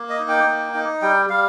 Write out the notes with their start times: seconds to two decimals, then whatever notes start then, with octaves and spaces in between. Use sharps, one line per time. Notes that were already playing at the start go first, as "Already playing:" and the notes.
Already playing: A#3
0.09 D#5
0.19 D#4
0.28 G5
0.47 A#3
0.74 D#4
1.02 G3 G5
1.30 G3 F5